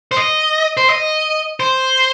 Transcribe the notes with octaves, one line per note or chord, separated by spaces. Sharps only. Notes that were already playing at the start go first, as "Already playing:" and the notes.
C5
D#5
C5
D#5
C5